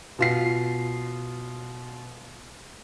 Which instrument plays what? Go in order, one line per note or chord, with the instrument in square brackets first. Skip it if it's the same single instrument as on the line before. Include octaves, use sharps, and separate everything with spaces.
[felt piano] B2 F4 C7